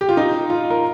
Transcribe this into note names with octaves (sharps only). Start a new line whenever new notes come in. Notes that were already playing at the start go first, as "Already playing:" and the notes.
G4
F4
D#4
F4
A#4